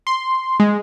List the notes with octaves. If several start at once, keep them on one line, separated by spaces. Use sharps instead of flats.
C6
G#3